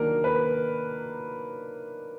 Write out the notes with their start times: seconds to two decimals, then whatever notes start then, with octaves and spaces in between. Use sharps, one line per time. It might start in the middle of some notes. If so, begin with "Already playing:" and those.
Already playing: D#3 F#3 A#3 D4 A#4
0.24 B4